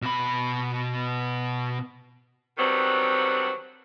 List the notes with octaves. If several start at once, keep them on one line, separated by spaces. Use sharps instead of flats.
B2 B5
D3 D#3 F#3 G3 B3 C4